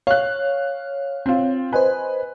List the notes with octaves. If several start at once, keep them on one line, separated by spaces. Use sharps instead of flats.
C#5 F5 F#6
C4 F4
B4 C5 D#5 G#5